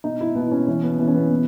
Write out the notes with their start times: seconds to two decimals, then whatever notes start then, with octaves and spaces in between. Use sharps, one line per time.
0.04 B2 D#4
0.21 E4
0.35 B2 B3
0.52 C#4
0.67 E3 C#4
0.83 B3
0.99 E3 B3
1.07 C#4
1.14 B3
1.31 B2